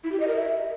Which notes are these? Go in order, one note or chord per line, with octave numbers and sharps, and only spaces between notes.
E4
G4
D#5
A#4
E5